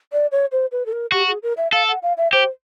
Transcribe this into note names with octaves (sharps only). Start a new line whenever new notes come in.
D5
C#5
C5
B4
A4
A#4
F#4 G4
G#4
A#4
E5
A4 F5
F#5
F5
E5
G4 C5